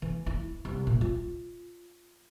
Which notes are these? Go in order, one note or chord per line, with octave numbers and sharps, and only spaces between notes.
E3
E4
C2
A#2
F4